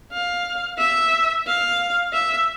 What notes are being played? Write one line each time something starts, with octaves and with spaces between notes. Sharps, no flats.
F5
E5
F5
E5